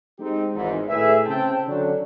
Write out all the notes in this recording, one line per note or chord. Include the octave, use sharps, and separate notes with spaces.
G#3 C4 D#4 G4
G#1 E2 G#2
A2 G#4 B4 E5
C#3 C4 G5 A5
D3 F#3 C#4 D4